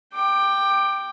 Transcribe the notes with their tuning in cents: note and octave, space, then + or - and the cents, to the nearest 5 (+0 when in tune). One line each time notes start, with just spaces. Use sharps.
G5 +0 D6 +20